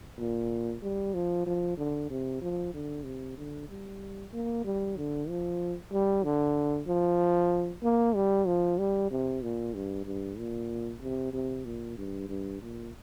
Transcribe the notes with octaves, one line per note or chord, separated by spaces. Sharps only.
A#2
G3
F3
F3
D3
C3
F3
D3
C3
D3
G3
A#3
G3
D3
F3
G3
D3
F3
A#3
G3
F3
G3
C3
A#2
G2
G2
A#2
C3
C3
A#2
G2
G2
A#2